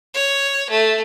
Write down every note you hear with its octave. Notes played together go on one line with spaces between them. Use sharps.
C#5
A3